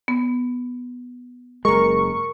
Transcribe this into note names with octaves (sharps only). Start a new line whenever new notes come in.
B3
F#1 G#3 A#4 C#6